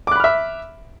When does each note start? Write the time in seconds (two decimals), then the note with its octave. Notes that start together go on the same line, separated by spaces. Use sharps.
0.07 D6
0.11 F#6
0.16 B5
0.20 F6
0.24 E5